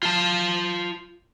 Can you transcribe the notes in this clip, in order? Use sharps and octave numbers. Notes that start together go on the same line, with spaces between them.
F4 A5